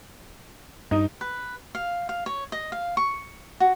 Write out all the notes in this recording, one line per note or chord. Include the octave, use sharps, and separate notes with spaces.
G2 D#4
B4
F5
F5
C#5
D#5
F5
C#6
F#4